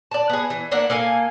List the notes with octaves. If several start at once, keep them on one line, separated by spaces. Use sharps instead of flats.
D5 A5
B3 G#4
E3
A#3 D4 E4 F#5
A#3 A4 F5 G#5